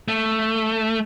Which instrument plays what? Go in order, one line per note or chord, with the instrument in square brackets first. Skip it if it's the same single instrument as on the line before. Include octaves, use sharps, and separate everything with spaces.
[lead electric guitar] A3